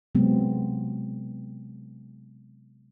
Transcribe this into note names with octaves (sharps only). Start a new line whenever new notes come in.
C3 F#3 G#3 B3 C4